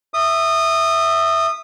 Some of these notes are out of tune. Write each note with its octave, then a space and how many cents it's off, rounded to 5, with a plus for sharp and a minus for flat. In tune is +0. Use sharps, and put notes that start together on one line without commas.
E5 +0 D#6 -20